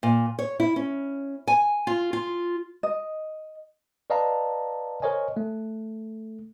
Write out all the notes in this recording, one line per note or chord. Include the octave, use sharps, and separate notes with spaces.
A#2
C#5
E4
C#4
G#5
F4
F4
D#5
B4 D5 D#5 F5 A5 A#5
A#4 C5 C#5 D#5 G#5
A3